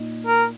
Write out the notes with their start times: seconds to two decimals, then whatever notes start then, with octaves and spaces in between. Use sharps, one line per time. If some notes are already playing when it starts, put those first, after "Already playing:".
Already playing: A#2 D#4
0.27 A#4